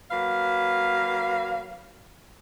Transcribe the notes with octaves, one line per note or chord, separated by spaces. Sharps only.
F#3 A#3 B4 F5